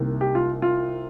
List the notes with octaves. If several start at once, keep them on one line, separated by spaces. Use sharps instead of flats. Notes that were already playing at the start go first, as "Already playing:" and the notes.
Already playing: C2 C3 D#3 A#3
G4
F4
F4